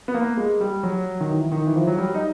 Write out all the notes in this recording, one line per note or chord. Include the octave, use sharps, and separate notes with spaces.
B3
A#3
G#3
G3
F#3
D#3
E3
D#3
E3
F3
F#3
G3
D#4